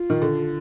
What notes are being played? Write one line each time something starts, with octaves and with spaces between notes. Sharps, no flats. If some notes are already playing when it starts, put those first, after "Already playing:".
Already playing: F4
D#3
D3